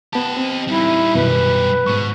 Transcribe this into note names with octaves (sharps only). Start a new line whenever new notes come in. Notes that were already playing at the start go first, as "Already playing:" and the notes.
B3 G4 D#5 A5
C4
G3 D#4 E4
F#2 B2 D#3 B4
G#2 B2 C#6